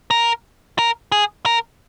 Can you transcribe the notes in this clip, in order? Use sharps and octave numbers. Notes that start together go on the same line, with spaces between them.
A#4
A#4
G#4
A#4